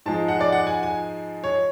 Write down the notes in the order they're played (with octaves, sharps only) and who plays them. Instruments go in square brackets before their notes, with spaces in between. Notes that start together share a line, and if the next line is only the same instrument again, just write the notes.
[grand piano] G#2 F3 G#3 A5
F#5
D5
F#5
G#5
G#5
C#5